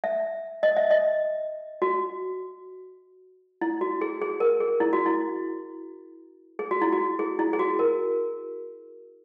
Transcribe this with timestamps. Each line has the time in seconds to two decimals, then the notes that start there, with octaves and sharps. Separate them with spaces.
0.04 E5
0.63 D#5
0.77 E5
0.91 D#5
1.82 F#4
3.61 E4
3.81 F#4
4.01 G#4
4.22 G#4
4.40 A#4
4.61 G#4
4.80 E4
4.93 F#4
5.06 E4
6.59 G#4
6.71 F#4
6.82 E4
6.92 F#4
7.19 G#4
7.39 E4
7.53 G#4
7.59 F#4
7.79 A#4